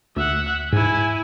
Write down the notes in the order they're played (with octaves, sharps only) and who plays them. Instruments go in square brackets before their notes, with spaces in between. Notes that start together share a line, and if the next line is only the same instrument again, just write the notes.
[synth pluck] D2 [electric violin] E5 F#5
[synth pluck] G#2 [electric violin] E4 G#5